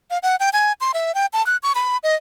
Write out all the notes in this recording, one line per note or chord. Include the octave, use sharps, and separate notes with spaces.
F5
F#5
G5
G#5
C6
E5
G5
A5
F#6
C#6
B5
D#5